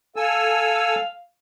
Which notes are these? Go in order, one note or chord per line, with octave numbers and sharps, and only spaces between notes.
A4 F5 G#5 E6